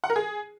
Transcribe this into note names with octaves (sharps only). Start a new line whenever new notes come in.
F#5
A#4
G#4